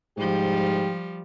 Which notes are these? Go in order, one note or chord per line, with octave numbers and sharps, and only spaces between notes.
G#2 F3 G3 G4